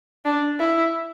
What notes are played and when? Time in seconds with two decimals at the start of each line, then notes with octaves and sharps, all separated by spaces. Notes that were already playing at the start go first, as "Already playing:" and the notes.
0.25 D4
0.59 E4